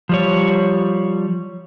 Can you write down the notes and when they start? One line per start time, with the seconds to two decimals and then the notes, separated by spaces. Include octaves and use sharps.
0.09 F3 G3 C#5